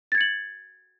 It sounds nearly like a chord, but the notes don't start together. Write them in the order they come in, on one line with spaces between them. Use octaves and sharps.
A6 G#6 C#7 F#7